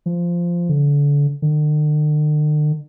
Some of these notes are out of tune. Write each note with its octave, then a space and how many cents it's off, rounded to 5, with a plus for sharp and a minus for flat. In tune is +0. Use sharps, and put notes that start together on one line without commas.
F3 -10
D3 -30
D3 +45